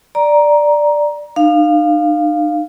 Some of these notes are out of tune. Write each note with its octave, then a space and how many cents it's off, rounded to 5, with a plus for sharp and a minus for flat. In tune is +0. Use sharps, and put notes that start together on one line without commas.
D5 +5 A#5 +10
D#4 -45 F5 +0